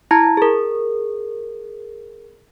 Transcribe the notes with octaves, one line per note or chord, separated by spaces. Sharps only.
E4 A5 A#5 G#6
G#4 A#4